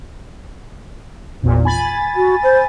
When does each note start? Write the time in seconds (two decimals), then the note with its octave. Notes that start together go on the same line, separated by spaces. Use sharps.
1.42 G#1 E2 A#2
1.65 G#5 B5 A6
2.16 F#4
2.43 C5